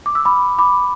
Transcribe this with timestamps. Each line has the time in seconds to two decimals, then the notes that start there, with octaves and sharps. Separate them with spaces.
0.06 D6
0.15 E6
0.25 B5 D6
0.58 B5 D6